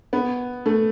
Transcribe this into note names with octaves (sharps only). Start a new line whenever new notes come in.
B3
A3